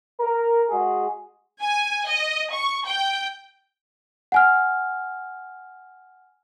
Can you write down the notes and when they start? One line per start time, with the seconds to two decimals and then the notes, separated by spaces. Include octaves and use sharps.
0.20 A#4
0.70 G#3 F#4 G#4
1.62 G#5
2.07 D#5
2.52 C#6
2.86 G5
4.32 F#5 G#5 F6